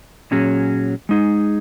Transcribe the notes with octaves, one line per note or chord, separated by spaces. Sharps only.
A#2 F#3 C#4 G#4
G#3 D#4 G#4